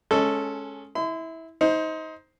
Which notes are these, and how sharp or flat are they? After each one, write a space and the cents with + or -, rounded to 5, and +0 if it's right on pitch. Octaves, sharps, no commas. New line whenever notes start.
G#3 +20 C#4 +0 A4 +0
E4 -20 C6 -45
D#4 +25 C5 +0